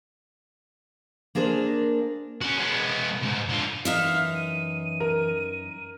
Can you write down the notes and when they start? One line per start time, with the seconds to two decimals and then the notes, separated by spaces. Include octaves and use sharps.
1.35 A#3 D4 G#4 A#4 C5
2.41 C#4 F#4
2.57 G#3 B3
3.22 C2 G#2
3.49 D3 F4
3.85 F#2 E3 D#4 E5 F5
4.35 D#7
5.00 A#4